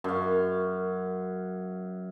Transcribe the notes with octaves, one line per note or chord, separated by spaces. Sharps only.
F#2 F5